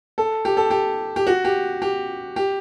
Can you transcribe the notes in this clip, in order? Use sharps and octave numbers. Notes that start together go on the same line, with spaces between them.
A4
G4
A4
G4
G4
F#4
G4
G4
G4